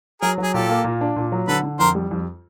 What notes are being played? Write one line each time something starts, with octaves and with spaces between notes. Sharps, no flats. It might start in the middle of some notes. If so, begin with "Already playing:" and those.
F#3 G#4 A#4
F#3 G#4
A#2 G4 A4
A#3
A#2
D4
A#2
F#3
D3 A4 B4
D3
F2 A#4 C5
G3
F2